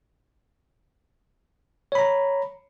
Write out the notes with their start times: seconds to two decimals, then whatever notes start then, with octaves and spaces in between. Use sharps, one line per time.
1.92 C#5
1.95 B5
1.99 A#5